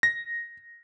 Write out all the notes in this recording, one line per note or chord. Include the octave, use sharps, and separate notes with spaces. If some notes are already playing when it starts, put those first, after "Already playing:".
A#6